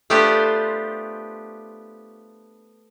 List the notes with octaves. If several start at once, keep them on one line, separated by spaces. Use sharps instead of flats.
A3 B3 D4 F4 G4 C5